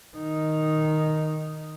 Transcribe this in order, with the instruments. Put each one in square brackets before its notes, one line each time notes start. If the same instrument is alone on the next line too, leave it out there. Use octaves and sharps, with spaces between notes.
[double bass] D#3 D#4